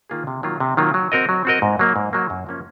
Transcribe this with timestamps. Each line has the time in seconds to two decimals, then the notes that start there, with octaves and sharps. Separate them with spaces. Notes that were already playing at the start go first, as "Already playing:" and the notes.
0.10 D#3 A#3 F4 G#4
0.27 C3
0.43 D#3 F#3 A#3 F4
0.60 C3
0.77 D#3 F#3 A#3 F4
0.94 F#3
1.12 C4 F#4 A#4 D#5
1.29 F#3
1.45 C4 F#4 A#4 D#5
1.62 G#2
1.79 F#3 A#3
1.96 G#2
2.13 F#3 A#3
2.30 F#2
2.47 F3 A#3 C#4